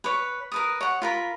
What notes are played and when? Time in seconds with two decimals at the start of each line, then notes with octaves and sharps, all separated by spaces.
0.04 B4 C#5
0.52 A#4 B4 D#6
0.81 C#5 F#5
1.02 F4 A#4 B5